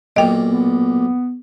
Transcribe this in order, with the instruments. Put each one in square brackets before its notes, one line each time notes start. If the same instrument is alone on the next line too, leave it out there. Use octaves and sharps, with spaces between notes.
[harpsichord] B1 A#2 [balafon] D#5 G5
[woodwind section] B3